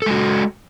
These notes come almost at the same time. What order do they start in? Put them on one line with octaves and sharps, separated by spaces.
A4 G#3 F#4